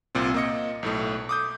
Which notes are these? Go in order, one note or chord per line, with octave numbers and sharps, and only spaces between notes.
C2 A#2 C4
A#3 D#5 C#7
B1 A2 A3
D6 D#6 G6